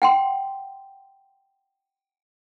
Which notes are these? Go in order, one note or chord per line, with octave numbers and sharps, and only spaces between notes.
F#5 G5 C6